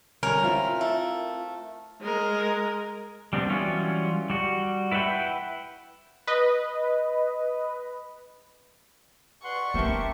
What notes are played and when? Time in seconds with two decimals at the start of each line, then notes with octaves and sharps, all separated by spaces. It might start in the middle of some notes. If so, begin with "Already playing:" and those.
0.23 D3 G3 C#4 A#4
0.43 C4 E4 F4
0.81 A3
2.01 G#3 A#4
3.33 G3 B3 C4 D4
3.49 E3 F#3 G3 C#4 F4
4.30 G3 F#4
4.91 E4 B4 E5 F#5 G5
6.27 B4 D#5
9.44 B4 D5 F#5 C6 C#6
9.74 B3 C#4 G4 A#4 C5 E5 A5